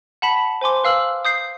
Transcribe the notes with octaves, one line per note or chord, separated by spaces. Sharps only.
F#5 A5 B5 B6
C5 G#5 C6 D6
B4 F5 E6 F6 F#7
D#6 G6 C7